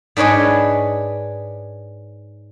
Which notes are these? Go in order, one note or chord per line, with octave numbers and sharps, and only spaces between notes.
G#2 D4 B4 C#5 D#5